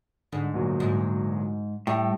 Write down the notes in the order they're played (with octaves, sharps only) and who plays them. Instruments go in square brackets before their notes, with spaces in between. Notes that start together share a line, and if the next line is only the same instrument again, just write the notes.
[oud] G#2 [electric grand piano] D3
[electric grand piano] D2 A#2 F#3
[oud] G#2
[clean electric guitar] A2 [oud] G3 [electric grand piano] G5